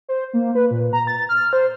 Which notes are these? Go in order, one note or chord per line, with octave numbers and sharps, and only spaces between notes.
C5
A#3
B4
A#2
A#5
A6
F6
C5